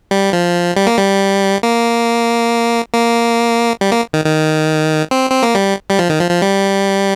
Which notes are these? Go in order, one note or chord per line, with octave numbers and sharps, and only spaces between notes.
G3
F3
G3
A#3
G3
A#3
A#3
G3
A#3
D#3
D#3
C4
C4
A#3
G3
G3
F3
D#3
F3
F3
G3